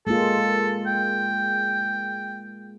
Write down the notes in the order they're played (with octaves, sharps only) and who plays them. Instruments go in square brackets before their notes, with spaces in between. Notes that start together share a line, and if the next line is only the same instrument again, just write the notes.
[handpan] G#3 A#3 F4 [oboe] A4
[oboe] G5